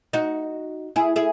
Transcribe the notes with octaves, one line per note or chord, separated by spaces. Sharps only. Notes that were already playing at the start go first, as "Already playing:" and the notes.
D#4 F#4
E4 G#4
E4 G#4